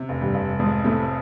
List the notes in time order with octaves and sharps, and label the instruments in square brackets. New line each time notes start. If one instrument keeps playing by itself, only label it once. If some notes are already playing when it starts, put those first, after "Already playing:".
Already playing: [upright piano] C3
F1
[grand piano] G2 G3
[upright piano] F1
[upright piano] F2 [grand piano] G#2 G#3
[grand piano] A2 A3 [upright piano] C3